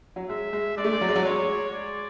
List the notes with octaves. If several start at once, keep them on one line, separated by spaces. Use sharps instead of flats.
F#3
G#3 E5
G#3
G#3 D5
A3
G#3
F#3
G#3
F#3
G#3 C#5
D5